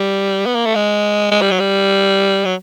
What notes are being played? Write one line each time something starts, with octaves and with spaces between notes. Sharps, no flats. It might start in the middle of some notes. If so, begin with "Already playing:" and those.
Already playing: G3
B3
A#3
A3
G#3
G#3
G3
F#3
G3
F#3